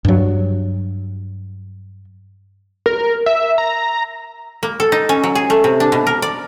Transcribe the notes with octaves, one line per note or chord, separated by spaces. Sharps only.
G2 F#3
A#4
E5
A#5
A#3
A4
D#4
C#4
F#3
G#4
A3
C3
D4
B2
A#4
D5